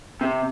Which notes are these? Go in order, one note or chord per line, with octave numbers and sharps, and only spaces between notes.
C3